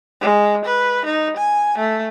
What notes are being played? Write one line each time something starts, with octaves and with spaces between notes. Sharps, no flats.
G#3
B4
D#4
G#5
A3